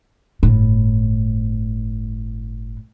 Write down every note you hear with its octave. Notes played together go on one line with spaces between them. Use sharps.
G1 A2